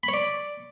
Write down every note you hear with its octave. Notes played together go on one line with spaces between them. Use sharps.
B5
C#5
D5